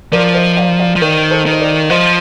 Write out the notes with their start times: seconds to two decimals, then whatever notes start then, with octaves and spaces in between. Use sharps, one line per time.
0.12 F3 A#4 D5
0.35 C5 D#5
0.57 D5 F5
0.79 D5 F5
0.96 F3
1.01 D#3 A#4 D5
1.31 A4 C5
1.46 D#3
1.51 C5
1.60 A#4 D5
1.90 F3 C5 D#5